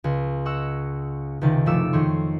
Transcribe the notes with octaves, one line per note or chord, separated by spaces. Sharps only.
C#2
D#5 F#5 C#6 E6
C#2 C3 D#3 A6
F#1 C3 F3 A3 D6 E6
F2 D#3 A3 C#5 C6